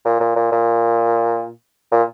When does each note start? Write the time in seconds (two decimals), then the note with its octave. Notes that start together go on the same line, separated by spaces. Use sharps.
0.05 A#2
0.20 A#2
0.36 A#2
0.52 A#2
1.92 A#2